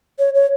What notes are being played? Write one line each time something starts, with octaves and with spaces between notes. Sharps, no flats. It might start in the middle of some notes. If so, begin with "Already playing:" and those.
C#5
C#5